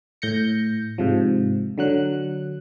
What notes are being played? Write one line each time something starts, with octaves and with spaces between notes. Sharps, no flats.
A2 G6 A#6 C#7
G#2 C3 F3
D3 F#3 F#6